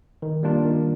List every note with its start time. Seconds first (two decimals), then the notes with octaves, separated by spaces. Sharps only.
0.22 D#3
0.43 G3 A#3 D4 F4
0.65 D#3